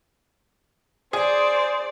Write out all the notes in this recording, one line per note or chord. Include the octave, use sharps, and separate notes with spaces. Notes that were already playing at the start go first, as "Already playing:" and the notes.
G#4 C5 D5